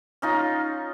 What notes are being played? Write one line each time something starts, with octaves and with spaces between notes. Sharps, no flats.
C#4 D#4 F4